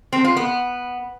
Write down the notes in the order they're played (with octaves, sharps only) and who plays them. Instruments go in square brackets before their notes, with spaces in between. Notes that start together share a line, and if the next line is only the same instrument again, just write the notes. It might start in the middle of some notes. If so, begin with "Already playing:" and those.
[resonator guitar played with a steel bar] C4
F4
B3